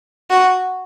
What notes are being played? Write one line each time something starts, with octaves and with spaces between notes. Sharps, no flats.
F#4